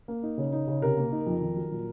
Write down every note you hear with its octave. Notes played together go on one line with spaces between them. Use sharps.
A#3
D#4
C#3
D#4
C#3
C3 A#4
A#3
D#4
F2
D#3
F#3
A#2